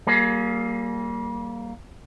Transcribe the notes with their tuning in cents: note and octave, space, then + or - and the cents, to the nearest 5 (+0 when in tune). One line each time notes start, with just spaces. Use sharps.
G3 -30 A#3 +0 G#4 +20